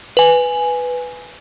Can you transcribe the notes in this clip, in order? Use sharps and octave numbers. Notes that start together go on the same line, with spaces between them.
B4 G#5